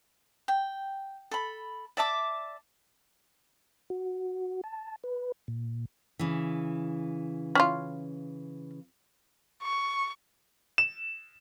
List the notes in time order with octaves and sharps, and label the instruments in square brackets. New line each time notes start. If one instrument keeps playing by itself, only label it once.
[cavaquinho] G5
A4 B5
D5 E5 A5 D6
[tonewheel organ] F#4
A5
B4
A#2
[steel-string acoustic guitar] C#3 E3
[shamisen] C#4 E4 F4
[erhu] C#6
[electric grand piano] E7